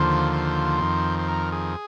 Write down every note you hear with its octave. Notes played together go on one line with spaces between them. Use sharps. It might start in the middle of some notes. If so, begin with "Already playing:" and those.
Already playing: D#2 D3 F3 C5
C5
F2 D#3
C5
A#4
G#4